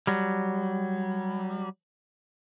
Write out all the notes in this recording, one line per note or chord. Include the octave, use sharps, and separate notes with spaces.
F#3 G3